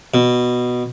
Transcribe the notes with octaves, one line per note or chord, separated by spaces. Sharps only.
B2